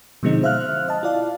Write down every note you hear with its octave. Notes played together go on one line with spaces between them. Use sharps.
B2 D3 F3 G#3 C4 D#4
C5 E5 F5 F6 F#6
D#5 A5
E4 F4 D5 F5